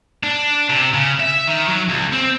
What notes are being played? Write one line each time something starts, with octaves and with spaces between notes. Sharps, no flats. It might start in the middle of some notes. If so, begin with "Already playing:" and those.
D4
C3
C#3
E5
D#3
F#3
C#2
C4